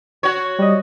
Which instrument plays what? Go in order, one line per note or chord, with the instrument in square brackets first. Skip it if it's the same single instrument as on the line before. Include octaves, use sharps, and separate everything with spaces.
[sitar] F#4 C#5
[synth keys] G3 D#5